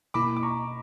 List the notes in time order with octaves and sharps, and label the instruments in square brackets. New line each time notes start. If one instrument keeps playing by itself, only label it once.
[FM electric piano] B2 A#3 E4 [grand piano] B5 D6
[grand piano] D6
A#5 C#6